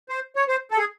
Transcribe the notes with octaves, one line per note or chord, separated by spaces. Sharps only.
C5
C#5
C5
A4
G#4